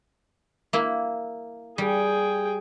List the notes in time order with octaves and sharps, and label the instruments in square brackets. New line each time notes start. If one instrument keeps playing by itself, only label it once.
[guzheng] A#3 E4
[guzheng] G3 [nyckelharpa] G#4 G5